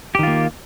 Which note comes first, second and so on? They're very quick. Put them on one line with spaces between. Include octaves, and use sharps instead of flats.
G4 D#3 F4 A#3